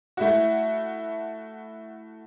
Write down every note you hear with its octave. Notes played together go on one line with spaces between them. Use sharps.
A3 E4 F#4